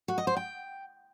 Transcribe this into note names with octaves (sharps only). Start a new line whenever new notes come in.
F#4
D#5
C5
G5